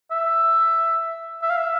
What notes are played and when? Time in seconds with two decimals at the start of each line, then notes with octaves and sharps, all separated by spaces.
0.11 E5
1.42 E5
1.50 F5
1.57 E5